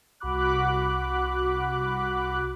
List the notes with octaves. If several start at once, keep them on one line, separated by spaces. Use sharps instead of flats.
C2 F#4 B5 D6 F#6